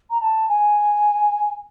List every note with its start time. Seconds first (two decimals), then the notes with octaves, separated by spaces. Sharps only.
0.10 A#5
0.21 A5
0.49 G#5